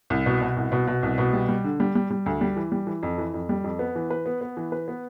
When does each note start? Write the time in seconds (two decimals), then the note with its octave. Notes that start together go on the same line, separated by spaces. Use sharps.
0.10 C2
0.26 B2
0.42 B2
0.57 C2
0.72 B2
0.87 B2
1.03 C2
1.18 B2
1.33 G3
1.49 G3
1.64 D3
1.80 G3
1.95 G3
2.10 G3
2.26 D2
2.41 G3
2.57 E3
2.72 G3
2.87 E3
3.03 F2
3.18 E3
3.34 F2
3.49 G3
3.64 F2
3.79 B3
3.96 E3
4.10 B4
4.26 B3
4.41 B3
4.57 E3
4.72 B4
4.88 B3